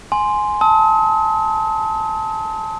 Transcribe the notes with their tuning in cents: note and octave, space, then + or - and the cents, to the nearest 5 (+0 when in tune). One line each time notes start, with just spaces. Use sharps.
G#5 +10 C6 +0
A5 +0 D#6 +45